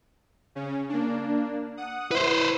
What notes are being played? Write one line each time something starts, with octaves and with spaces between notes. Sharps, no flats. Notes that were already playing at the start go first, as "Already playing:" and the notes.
C#3 C#4
A#3 D4
F#5 D#6
E4 B4 C5